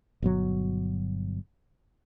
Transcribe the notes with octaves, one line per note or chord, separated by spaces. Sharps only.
G1 B2 F#3